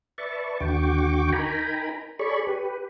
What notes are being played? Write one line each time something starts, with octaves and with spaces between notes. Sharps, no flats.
B4 D5 E5 A5 C#6
D#2 D3 F#4 G5 C#6 D6
D#4 A#4 G5 G#5 A#5 B5
G#4 A4 C#5 D5 B5 C#6
G4 B4